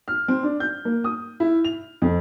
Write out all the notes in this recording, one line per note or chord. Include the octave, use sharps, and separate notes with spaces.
F6
C4
D4
G6
A#3
D#6
E4
F7
F2